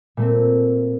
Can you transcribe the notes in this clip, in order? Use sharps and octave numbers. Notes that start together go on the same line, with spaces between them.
A#2 A3 C4